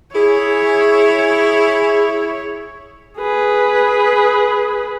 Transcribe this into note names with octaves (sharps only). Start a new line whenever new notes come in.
E4 G#4 C#5
G#4 B4